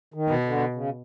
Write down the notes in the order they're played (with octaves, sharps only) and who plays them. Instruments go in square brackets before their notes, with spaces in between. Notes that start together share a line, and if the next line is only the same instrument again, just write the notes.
[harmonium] D#3
[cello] B2
[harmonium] D3
C#3